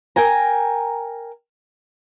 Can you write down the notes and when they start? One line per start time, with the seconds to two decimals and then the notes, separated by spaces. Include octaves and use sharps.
0.16 A#4 G5 G#5 A#5